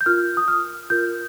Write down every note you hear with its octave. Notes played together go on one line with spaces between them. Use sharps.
G6
F4 A#4 F6
D#6
F6
F4 A#4 G6